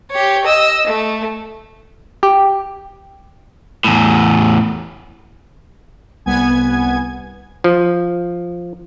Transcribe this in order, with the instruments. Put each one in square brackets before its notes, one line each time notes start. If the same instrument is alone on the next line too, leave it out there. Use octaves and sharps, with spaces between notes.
[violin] G4 C#5
D#5 E6
A3
[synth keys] G4
[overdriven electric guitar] E2 A2
[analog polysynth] C2 B3 G#5 G#6
[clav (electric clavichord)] F3